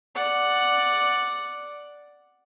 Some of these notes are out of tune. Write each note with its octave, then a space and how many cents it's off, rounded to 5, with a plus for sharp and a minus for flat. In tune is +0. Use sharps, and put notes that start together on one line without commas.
D5 +0 F#5 +0